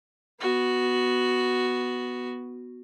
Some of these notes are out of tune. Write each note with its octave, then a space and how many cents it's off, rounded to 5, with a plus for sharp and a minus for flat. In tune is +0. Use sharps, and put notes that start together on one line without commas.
B3 +0 F#4 +0